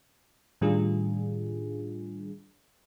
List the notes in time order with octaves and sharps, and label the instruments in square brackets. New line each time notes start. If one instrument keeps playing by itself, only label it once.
[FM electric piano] A2 D#3 G3 D4 F4 G#4